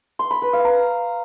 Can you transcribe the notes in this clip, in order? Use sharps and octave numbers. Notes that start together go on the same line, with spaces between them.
C6
B5
B4
F5
A#5